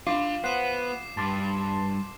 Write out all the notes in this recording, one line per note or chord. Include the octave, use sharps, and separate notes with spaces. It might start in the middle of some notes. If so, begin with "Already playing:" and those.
D4 F4 G4 F5 D6
B3 C5 F#5 C7 E7
G2 A5 C6 D6